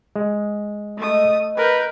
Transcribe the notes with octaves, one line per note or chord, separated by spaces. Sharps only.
G#3
A3 D#5 D#6
A#4 B4 G6